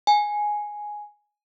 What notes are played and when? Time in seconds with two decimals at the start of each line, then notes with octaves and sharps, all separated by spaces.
0.07 G#5